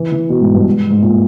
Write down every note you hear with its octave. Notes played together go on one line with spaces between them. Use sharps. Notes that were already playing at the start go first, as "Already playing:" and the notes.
Already playing: E3
E3
B2
G#2
G2
G#2
G#2
A#2